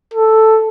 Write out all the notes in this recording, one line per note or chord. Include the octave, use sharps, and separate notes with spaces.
A4